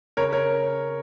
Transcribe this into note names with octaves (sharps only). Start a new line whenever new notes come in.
C#3 A#4 C#5
A#4 C#5